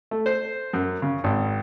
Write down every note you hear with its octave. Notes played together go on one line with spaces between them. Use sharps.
A3
C5
F#2
C#3
G#1